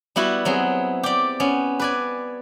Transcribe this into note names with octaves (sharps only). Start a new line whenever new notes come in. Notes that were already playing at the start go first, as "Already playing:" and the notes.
G3 B3 E4 F#4
F#3 B3 C4 G#4
G4 D5
B3 C#4
B4 D5 G#5